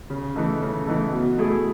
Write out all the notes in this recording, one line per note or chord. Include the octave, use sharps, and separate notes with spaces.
C#3
E3 A3 D#4 A4
C#3
E3 A3 D#4 A4
B2
A3 E4 G#4